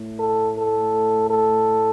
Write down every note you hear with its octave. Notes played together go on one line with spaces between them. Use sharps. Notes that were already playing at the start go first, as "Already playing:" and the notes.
Already playing: A2 A3
A4
A4
A4